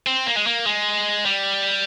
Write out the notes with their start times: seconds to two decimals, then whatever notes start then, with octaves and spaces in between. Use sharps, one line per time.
0.07 C4
0.26 A#3
0.37 G#3
0.47 A#3
0.66 G#3
1.25 G3